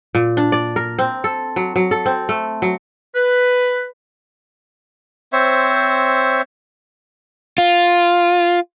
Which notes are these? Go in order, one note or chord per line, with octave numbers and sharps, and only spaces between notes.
A#2
D4
D5
A#4
C4
A4
F#3
F#3
A4
C4
A3
F#3
B4
C4 C5 C#5 E5
F4